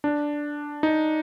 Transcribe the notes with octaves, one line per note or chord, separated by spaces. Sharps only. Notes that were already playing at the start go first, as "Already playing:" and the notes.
D4
D#4